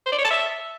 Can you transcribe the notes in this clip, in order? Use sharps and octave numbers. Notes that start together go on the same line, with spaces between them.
C5
D5
C#5
A5
E5